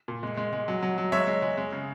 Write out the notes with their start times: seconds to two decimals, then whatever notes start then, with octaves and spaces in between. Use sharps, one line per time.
0.08 A#2
0.23 G#3
0.38 G#3
0.53 G#3
0.68 F#3
0.83 F#3
0.98 F#3
1.12 G#3 C#5 E5
1.27 G#3
1.42 G#3
1.58 G#3
1.72 C#3